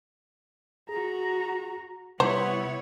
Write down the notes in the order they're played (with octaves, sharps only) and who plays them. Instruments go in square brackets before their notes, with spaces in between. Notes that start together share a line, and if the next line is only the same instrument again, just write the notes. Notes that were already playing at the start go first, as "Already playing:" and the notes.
[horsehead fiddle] F#4 A#5 [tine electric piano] G#4
[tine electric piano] C3 G3 [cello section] B3 C#5 [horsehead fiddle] E4 F#5 [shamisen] C5